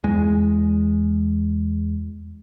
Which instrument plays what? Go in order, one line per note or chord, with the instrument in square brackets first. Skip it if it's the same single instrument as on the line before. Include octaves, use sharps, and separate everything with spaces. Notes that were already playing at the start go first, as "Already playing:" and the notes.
[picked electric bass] E2 G#3